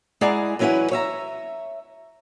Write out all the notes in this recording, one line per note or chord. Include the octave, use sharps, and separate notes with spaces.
G#3 E4 G#4 D5 F#5 A#5
E3 F#3 C#4 E4 B4 F#5
C#5 E5 A#5